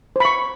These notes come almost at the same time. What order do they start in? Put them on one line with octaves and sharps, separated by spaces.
C5 B5 C#6